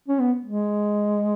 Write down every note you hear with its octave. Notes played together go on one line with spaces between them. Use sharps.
C#4
B3
G#3